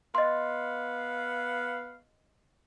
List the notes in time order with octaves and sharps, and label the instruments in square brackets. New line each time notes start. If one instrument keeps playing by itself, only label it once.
[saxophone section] B3 F5 [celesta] D#5 C6